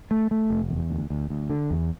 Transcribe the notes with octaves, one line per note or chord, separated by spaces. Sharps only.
A3
A3
F1
E2
D2
D2
D2
D3
E2